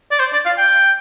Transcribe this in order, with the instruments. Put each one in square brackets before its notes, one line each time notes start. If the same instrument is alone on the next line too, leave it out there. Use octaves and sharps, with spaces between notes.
[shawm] D5
C5
D5
F5
G5